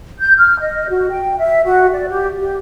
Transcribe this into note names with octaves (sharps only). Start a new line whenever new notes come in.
G6
F6
D#5
F#4
G5
E5
F#4
D5
G4
G4